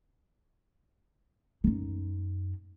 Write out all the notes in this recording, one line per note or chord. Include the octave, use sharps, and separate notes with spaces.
F#2 D#4